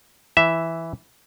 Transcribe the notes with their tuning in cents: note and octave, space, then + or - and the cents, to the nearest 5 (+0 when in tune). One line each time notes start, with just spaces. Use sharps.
E3 +0 E5 +0